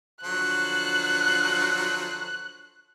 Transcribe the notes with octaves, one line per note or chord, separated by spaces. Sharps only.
D3 F3 F#3 F#6